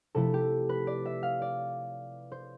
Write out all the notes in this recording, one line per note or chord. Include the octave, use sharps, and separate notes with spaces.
C3 F3 A3 E4 A4
G4
B4
D5
E5
F5
D5
C5